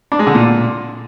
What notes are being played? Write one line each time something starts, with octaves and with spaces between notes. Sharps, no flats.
D4
G#3
D3
A#2